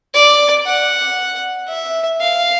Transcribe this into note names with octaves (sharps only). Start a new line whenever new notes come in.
D5
F#5
E5
F5